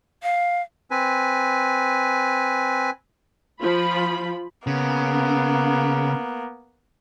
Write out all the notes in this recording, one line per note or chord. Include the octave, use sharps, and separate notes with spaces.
F5
C4 B4 G#5
F3 F4 B5
C#3 A#3 B3